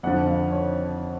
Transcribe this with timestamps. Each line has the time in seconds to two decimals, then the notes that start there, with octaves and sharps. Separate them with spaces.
0.03 F2 D3 F3 F#5
0.28 F5
0.51 C#5